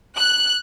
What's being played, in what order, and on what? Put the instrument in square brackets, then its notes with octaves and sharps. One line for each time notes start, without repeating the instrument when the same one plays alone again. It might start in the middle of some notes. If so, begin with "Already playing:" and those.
[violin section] F#6